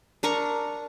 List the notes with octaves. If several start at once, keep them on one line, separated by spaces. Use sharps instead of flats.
D4 A#4 A#5 C#6